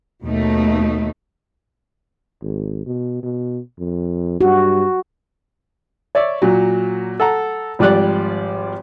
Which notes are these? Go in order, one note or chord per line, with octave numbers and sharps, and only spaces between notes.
D#2 B2 A3 D#4
G#1
B2
B2
F2
G2 F#4
C#5 D5 E5
A#2 F#3
A4 F#5 A#5
G#1 F3 G3 G4 D5 F#6